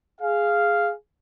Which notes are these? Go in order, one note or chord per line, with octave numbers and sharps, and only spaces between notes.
G#4 F5